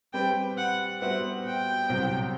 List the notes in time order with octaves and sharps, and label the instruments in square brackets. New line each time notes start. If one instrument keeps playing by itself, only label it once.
[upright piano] G3 C4 G4 B4 [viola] G5
[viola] F#5
[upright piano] G3 B3 F#4 C5 E5 [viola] F#5
[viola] G5
[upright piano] C2 C3 F#3